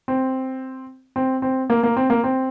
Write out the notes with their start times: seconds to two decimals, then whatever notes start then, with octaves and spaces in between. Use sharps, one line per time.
0.08 C4
1.16 C4
1.42 C4
1.70 A#3
1.83 A#3
1.97 C4
2.10 A#3
2.24 C4